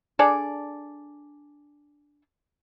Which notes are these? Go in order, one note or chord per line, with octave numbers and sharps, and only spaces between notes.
D4 G#4 A4 D5